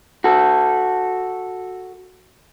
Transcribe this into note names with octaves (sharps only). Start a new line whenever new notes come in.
F#4 A4